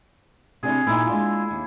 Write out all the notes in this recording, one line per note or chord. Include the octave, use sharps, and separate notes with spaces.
C3 D4 E4 G#4
A#2 D#4 E4
G#3 D4 F4
D#2